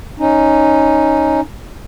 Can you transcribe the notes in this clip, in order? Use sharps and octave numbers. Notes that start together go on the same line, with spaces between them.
C#4 D#4